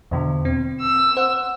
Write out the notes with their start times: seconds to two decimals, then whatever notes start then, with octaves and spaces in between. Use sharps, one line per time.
0.11 E2 B2 D3
0.45 C4
0.80 E6
1.17 C5 F#5